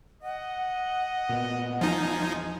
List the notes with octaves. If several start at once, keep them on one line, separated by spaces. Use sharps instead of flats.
D#5 F#5
A#2 B3
E2 F3 D#4 G#5